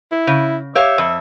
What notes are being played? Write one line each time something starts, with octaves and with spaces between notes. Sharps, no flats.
E4
C#3
G4 C#5 E5 F5
F2